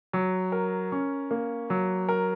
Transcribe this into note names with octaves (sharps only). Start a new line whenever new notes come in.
F#3
A#4
C#4
A#3
F#3
A#4